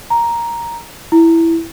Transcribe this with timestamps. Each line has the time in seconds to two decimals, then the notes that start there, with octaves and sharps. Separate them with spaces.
0.10 A#5
1.12 E4